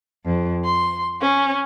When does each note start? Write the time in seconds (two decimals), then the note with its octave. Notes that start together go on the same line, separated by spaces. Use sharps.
0.24 F2
0.63 C6
1.19 C#4